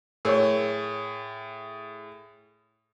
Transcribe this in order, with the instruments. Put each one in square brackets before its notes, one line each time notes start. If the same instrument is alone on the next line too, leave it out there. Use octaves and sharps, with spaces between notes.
[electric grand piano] A2 G#4 [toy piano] A#4 C#5 C#6